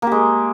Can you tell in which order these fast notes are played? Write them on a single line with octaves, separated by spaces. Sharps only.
A#3 G4 G#3